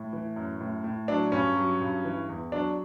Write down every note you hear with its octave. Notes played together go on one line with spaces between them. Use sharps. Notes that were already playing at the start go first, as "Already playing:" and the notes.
Already playing: A2
E3
F#2
A2
A2
F#3 D4
G2 C#4
F#3
G2
E3
E2
F#3 D4